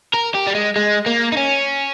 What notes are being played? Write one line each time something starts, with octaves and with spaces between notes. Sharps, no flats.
A#4
G4
G3
G#3
G#3
A#3
D#4
C#4